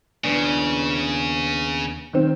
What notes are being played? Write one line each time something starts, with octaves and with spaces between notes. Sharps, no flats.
D#2 C#3 B3 D4
D#3 C4